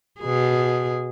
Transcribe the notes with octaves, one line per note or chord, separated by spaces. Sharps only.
B2 G#4